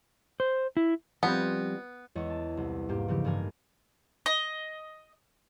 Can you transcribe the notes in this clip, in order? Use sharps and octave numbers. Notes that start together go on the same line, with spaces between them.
C5
E4
F3 G3 B3 C4
E2 G#3 C#5 D#5
A5
C2
G#2 A#3 G4
C#3 E3 F3 G4
A1 G2 D4 A#4 G#5
D#5